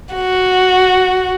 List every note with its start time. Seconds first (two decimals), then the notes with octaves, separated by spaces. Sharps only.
0.15 F#4